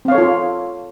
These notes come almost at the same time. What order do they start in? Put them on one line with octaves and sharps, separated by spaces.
C4 F5 C#5 A4 F4